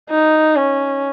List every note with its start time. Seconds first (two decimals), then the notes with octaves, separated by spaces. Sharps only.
0.10 D#4
0.56 C#4